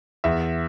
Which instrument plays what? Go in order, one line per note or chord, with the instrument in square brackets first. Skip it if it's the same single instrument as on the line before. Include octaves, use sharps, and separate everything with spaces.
[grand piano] E2 E5